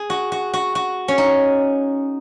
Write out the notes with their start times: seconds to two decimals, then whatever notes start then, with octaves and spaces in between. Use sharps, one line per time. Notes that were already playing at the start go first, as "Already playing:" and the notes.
Already playing: G#4
0.10 F#4
0.32 F#4
0.54 F#4
0.75 F#4
1.08 C#4
1.18 D#4